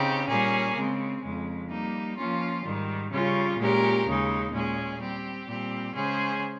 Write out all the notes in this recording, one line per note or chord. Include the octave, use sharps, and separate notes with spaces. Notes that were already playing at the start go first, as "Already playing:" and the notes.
Already playing: C#3 C4 D#4 G4
A#2 G3 A#3 C#4 G#4
C#3 G#3 C4
F2 C#3 G#3
G3 A#3 D#4
F3 A#3 C#4 F4
G#2 D#3 G3
C#3 G3 C#4 F4
A#2 G#3 C#4 G4 A#4
D#2 C#3 G#3 D#4
A#2 G#3 C#4 G#4
G3 C4 G4
A#2 G3 C4 G4
C#3 G#3 C#4 G#4 C5